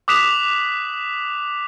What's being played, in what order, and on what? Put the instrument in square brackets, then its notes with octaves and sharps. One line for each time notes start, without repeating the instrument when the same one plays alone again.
[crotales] D6 D#6 F#6 B6 E7 F7